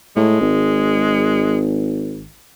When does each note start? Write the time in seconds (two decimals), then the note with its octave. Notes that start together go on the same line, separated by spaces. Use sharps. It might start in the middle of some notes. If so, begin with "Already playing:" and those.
0.16 A2 G#3
0.41 G#1